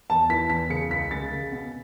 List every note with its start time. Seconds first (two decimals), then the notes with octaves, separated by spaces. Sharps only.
0.09 E2 A5
0.30 E3 B6
0.50 E2 B6
0.70 C#3 C#7
0.91 C#2 B6
1.11 C#3 A6
1.32 C#3
1.52 B2